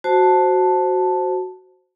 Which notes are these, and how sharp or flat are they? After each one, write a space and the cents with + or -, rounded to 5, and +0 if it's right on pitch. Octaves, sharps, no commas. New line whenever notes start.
F#4 +0 C5 +0 A5 +0